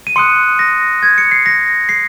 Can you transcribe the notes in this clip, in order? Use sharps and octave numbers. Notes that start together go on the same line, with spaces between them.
D#7
C6 D#6 F#6 C#7
A#6
G#6
C#7
C7
A#6
C7